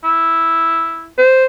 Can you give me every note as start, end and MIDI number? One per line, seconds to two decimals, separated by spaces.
0.04 1.10 64
1.18 1.45 72